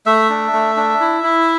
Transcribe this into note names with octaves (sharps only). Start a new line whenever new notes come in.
A3 E5
D4
A3
D4
E4
E4